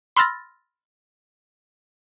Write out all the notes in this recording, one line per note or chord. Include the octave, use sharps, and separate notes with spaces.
B5 C6 E6 F6 A6 A#6